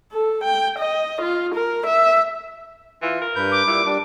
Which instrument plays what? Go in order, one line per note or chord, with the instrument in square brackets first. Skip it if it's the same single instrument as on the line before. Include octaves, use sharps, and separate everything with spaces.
[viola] A4
G5
D#5
F4
A#4
E5
[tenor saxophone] E3 [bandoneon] F4
[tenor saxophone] A#4
[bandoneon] G2 B4 G6
[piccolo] D6
[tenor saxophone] A#2 [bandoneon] G3 E4
[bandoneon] G3 D4